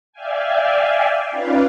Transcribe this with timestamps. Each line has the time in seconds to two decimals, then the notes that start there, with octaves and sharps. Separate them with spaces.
0.13 D5 E5 F5 G5 G#5
1.31 C#4 D#4 F4 B4 D5 F5